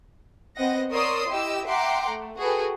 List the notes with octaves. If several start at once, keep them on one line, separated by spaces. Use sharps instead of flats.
B3 C4 D#5 F#5 A#6
A#4 C#5 D5 C6 D#6 E6
E4 G4 D#5 E6
E5 F#5 G5 A#5 C6 D6
A3
F#4 G#4 A4 B4 G5